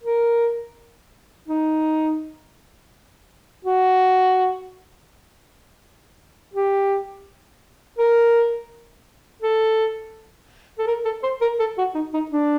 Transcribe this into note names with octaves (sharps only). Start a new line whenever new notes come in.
A#4
D#4
F#4
G4
A#4
A4
A4
A#4
A4
C5
A#4
A4
F#4
D#4
D#4
D4